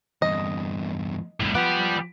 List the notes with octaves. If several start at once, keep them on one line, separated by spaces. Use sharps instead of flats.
E2 G2 D#5
C2 A2
F3 B3 G4 D5